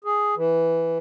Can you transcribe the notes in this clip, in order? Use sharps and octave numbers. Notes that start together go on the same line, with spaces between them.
G#4
E3